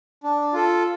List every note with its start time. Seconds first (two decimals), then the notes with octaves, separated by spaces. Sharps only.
0.24 D4
0.53 F4 A4